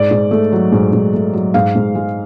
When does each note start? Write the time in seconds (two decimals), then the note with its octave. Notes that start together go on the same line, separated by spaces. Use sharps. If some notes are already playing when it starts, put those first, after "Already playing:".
Already playing: G#2 D5
0.11 G#2
0.31 A3
0.52 F#3
0.72 G#2
0.93 G#2
1.13 A3
1.33 F#3
1.54 G#2 F5
1.75 G#2
1.95 G#3